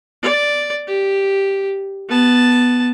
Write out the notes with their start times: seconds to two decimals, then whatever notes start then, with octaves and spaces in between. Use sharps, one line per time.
0.22 D5
0.87 G4
2.09 B3 A5